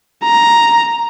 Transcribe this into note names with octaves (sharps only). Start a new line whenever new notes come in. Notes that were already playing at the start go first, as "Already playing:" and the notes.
A#5